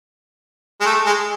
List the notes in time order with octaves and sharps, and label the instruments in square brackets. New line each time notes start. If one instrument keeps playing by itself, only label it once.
[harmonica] G#3
A3
G#3